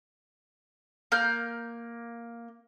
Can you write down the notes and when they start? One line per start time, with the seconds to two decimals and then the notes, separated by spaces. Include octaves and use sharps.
1.12 A#3 F6 G6